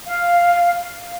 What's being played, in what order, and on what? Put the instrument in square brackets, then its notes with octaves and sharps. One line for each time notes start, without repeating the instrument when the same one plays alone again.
[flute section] F5